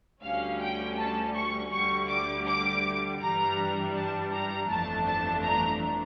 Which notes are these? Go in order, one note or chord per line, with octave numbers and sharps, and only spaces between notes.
D2 D3 G3 C#4 F5
G5
A5
C#6
D2 D3 G3 C#6
D6
D6
G2 E3 G3 D4 A#5
A5
A#5
G1 F2 E3 A3 D4 A5
A5
A#5